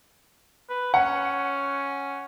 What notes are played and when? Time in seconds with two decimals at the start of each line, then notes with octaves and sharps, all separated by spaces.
0.70 B4
0.94 C#4 F#5